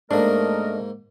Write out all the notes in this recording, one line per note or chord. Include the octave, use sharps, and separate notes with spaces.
G#2 A3 A#3 D4 A#4 D#5